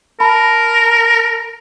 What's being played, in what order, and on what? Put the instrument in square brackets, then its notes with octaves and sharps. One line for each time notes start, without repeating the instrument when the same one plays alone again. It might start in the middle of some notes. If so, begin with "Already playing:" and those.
[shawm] A#4 [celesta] A5 B5